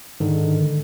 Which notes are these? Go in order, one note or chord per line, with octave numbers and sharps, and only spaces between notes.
G#2 D3 D#3